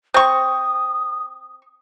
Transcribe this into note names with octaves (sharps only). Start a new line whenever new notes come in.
C4 C#6 D#6